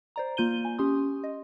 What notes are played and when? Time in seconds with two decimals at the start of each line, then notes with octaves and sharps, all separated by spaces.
0.16 C5 D5 A#5
0.37 A#3 F4 G6 D#7 G7
0.65 G#5
0.79 C#4 G4 C6 D#6
1.24 D#5